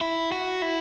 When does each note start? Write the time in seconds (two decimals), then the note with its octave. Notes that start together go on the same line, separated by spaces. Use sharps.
0.01 E4
0.32 F#4
0.62 E4